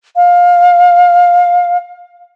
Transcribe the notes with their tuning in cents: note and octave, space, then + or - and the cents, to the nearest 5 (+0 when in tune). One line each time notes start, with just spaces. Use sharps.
F5 +20